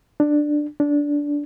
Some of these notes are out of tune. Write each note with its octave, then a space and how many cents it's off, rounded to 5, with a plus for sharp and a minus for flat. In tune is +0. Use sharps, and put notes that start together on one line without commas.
D4 +10
D4 -15